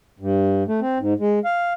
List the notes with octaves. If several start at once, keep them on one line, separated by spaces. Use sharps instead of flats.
G2
A3
C4
G#2
G#3
F5